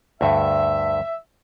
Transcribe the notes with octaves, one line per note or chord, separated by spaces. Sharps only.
D2 G2 E5